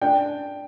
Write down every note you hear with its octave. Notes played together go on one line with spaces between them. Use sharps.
D4 G5